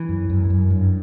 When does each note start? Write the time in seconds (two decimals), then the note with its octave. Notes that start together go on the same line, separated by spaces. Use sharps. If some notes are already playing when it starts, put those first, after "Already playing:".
Already playing: E3
0.09 F#2
0.30 F#2
0.50 F#2
0.70 G2